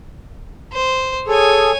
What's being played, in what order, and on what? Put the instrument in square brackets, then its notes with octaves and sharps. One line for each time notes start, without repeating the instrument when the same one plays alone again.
[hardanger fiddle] C5
[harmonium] G#4 A4 [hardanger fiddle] C#5 G#5